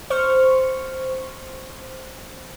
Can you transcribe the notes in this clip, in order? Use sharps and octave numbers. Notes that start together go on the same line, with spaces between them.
C5 C#6 F6